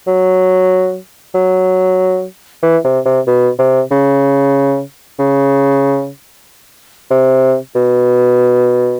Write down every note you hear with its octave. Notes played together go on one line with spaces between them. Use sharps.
F#3
F#3
E3
C3
C3
B2
C3
C#3
C#3
C3
B2